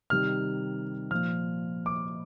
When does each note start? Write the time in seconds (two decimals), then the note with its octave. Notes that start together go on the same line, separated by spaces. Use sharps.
0.10 C3 D#3 G3 F6
1.11 A#2 F3 F6
1.86 D6